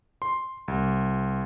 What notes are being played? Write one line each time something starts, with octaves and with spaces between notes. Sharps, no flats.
C6
C2